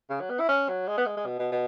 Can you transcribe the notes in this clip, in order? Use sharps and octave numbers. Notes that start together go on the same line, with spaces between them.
C#3
F#3
B3
E4
C#4
F#3
G#3
B3
G#3
G#3
B2
B2
B2